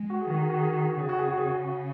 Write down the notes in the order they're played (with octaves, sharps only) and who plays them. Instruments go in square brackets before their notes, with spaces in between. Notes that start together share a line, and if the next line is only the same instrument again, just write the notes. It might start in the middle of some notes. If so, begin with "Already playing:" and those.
Already playing: [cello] G#3
[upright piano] F#4
G#4
[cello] D#3 [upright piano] F#4
[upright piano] G#4
F#4
G#4
F#4
G#4
F#4
[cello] C#3 [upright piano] G#4
[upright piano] F#4
G#4
F#4
G#4
F#4
F#4